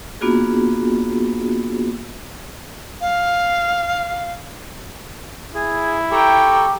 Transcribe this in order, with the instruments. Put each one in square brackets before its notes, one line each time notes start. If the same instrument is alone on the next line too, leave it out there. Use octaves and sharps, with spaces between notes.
[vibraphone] A#3 B3 D4 F4 F#4 G#4
[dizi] F5
[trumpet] E4 [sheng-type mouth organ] G#4
[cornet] G4 [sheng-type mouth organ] A4 C#6 E6 [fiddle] G5 A#5